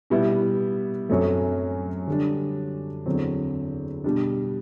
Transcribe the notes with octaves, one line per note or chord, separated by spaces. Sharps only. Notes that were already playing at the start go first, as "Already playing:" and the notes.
B2 G3 B3 E4
F#2 F#3 A3 C4
D3 G3 D4
E2 D3 F#3 C4
B2 G3 D4